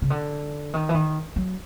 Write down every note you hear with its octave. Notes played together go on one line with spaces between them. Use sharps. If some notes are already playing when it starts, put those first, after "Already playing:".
C#3
D3
D#3
E3
D#3
F#3